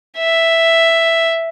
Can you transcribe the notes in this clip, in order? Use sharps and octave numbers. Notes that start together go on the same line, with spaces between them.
E5